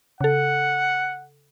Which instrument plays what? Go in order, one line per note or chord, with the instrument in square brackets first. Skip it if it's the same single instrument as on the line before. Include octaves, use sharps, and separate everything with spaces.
[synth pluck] C#3 A4 [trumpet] F#5